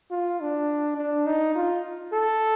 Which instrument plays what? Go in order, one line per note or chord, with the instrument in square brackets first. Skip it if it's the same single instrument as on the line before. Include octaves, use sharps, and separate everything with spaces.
[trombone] F4
D4
D4
D#4
F4
A4